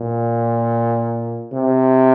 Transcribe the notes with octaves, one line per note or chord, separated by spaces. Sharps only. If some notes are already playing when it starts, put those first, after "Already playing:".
Already playing: A#2
C3